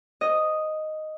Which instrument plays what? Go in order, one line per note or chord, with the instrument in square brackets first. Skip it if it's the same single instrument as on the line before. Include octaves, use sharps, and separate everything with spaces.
[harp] D#5